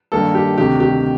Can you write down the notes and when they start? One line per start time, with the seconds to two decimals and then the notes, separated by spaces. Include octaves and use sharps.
0.12 G2 D#3 A#3 A4
0.35 G4
0.58 D2 C3 D#3 G4
0.80 G4